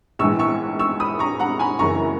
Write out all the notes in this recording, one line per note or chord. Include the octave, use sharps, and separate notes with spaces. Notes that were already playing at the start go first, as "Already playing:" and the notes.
A#1 G#2 E3 C#6 E6
C#6 E6
C#6 E6
B5 D#6
A#5 C#6
F#5 A#5
G#5 B5
F#1 F#2 C#3 E3 A#5 C#6